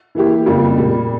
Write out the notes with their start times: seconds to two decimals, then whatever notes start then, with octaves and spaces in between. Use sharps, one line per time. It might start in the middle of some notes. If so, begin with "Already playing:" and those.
0.15 E3 A#3 E4 G4
0.46 F2 C#3 G3 A#3 F4
0.78 A#2 G3 A#3